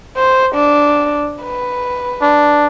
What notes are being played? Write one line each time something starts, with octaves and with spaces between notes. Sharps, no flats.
C5
D4
B4
D4